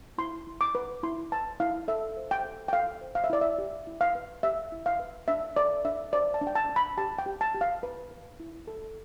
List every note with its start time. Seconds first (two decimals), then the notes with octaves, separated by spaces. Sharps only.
0.18 E4 C6
0.47 E4
0.61 D6
0.75 B4
1.03 E4 C6
1.32 B4 A5
1.60 E4 F5
1.88 A4 E5
2.17 C5
2.31 G5
2.45 A4
2.68 G5
2.73 A4 F5
3.01 C5
3.15 F5
3.24 E5
3.30 E4 D5
3.41 E5
3.58 G4
3.87 E4
4.01 F5
4.15 B4
4.43 G4 E5
4.72 E4
4.86 F5
5.00 B4
5.28 D4 E5
5.56 A4 D5
5.85 D4 E5
6.13 C5 D5
6.34 A5
6.41 D4
6.47 G5
6.55 A5
6.69 D4
6.76 B5
6.98 G4 A5
7.18 G5
7.26 G4
7.41 A5
7.54 G4
7.61 F5
7.83 B4
8.11 B4
8.40 E4
8.67 A4